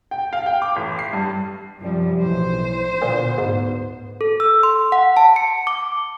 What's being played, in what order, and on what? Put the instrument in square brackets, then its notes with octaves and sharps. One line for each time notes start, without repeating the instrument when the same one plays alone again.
[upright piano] G5
F5
G5
D6
A1
C7
G2
[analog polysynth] C2 G3 [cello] F#2 F3
[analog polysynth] B1 A2 E3 [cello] C5
[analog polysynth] D2 B3 [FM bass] A#2
[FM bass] G#2
[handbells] A4
E6
C6
F#5
A5
C#7
D6